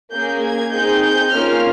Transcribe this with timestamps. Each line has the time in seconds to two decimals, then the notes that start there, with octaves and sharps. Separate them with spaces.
0.12 A#3 C#4 G#4 G6
0.42 G#6
0.73 C4 D#4 G#4 G6
1.03 G6
1.33 A#3 C#4 F4 F6